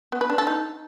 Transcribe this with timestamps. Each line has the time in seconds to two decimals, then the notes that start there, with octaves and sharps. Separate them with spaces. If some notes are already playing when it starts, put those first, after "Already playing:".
0.12 B3
0.21 B4
0.30 D4
0.38 A4
0.47 D#4